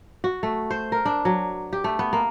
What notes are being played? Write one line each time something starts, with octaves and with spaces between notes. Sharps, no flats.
F#4
A3
C5
A#4
D4
F#3
G4
A3
B3
A#3